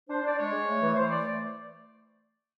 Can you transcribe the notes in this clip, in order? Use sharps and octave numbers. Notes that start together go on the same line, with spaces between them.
D4 C5
D4 D5
G#3 C#5
G#3
A3
E3
E3 C5
A3 D5